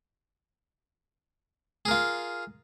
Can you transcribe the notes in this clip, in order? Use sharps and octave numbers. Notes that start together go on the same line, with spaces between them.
F4 G#4 A#4